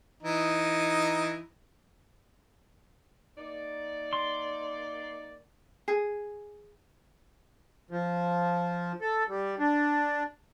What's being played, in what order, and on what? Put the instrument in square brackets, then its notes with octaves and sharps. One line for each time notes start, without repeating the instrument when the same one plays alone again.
[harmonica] E3 D#4
[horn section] A#3 D#4 D5
[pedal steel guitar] C6
[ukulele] G#4
[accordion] F3
A4
G3
D4